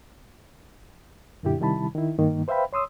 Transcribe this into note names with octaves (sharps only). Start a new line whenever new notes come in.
F#2 A#2 D3 E4 G4
C3 D#3 G3 E4 A5 B5
D#3 E4
G2 D#3 A#3
B4 C5 E5 F5 G5 B5
C#5 C6 D#6 E6